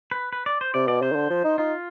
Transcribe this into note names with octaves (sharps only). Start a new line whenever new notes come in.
B4
B4
D5
C5
C3 D5
B2 D5
C3 C5
D#3
D3
F3
D#4
D#4 F4